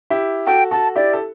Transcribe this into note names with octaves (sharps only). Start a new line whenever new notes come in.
E4 G4
F#4 A4 G5
F#4 A4 A5
E4 G4 D5
A4